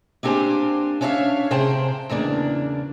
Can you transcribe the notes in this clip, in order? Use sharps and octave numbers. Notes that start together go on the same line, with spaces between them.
A#3 C4 D4 G4 C5 G#5
C#4 D4 C#5 D5 E5 F5
C3 G#4 C5 G5 A5
E2 C#3 A#3 D4